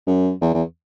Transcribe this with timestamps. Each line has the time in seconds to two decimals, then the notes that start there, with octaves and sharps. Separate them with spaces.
0.07 F#2
0.41 E2
0.54 E2